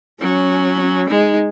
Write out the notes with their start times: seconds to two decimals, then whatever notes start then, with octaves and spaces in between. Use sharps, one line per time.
0.21 F#3 C#4
0.81 C#4
1.09 G#3 D#4